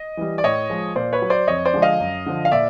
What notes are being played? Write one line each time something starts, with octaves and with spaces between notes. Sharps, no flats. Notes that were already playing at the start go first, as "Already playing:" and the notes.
Already playing: D#5
E3 G3
D5
A2 C#5 D#5
F3 G#3
A#2 C5 D5
B4 C#5
F#3
C5 D5
F2 C#5 D#5
C5 D5
D3 F3 G#3
D#5 F5
F#2
D3 F3
F5
A#2 D5 E5